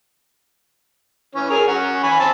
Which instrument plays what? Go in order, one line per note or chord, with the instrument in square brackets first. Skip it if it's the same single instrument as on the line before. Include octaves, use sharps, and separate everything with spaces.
[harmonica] E3 C#4
G#4 A#4
C#4 F#5
G#5 B5
C4 A5